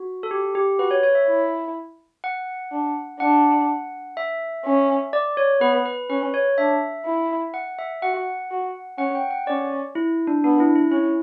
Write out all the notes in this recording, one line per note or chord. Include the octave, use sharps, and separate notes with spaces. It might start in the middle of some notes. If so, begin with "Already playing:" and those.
Already playing: F#4
A4
G4
G4
F#4 B4
C#5
C#5
E5
E4
F#5
D4
D4 F#5
E5
C#4
D5
C#5
B3 B4
B4
C#4 B4
C#5
D4 E5
E4
F#5
E5
F#4 F#5
F#4
C#4 F#5
G5
F#5
C#4 D5
E4
D4
B3 D4
E4
E4
C#4 E4